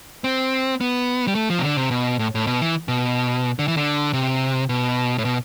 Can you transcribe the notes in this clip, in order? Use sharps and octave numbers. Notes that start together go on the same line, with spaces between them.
C4
B3
G3
A3
F3
C3
D3
C3
B2
A2
A2
B2
E3
B2
D3
E3
D3
C3
B2
A2
B2